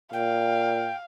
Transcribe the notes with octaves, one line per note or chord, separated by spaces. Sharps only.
A#2 F5 G5